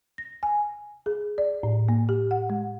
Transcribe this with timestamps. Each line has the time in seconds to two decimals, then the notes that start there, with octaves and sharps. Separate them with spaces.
0.18 A#6
0.43 G#5
1.06 G#4
1.38 D5
1.63 A2
1.88 A#3
2.09 G4
2.31 F#5
2.50 G#3